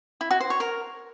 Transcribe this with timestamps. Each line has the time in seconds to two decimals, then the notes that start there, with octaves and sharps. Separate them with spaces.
0.21 E4
0.31 F#4
0.40 C5
0.50 C#5
0.60 A#4